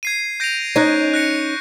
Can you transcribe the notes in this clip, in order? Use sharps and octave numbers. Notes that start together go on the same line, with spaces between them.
G#6 C7 D#7
G6 A#6 D7 F7
C#4 D#4 C#6 F#6 A#6
F#6 A#6 C#7